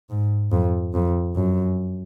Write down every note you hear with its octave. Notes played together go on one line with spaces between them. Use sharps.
G#2
F2
F2
F#2